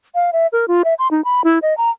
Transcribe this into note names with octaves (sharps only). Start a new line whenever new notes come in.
F5
E5
A#4
F4
E5
C6
D#4
B5
E4
D#5
A#5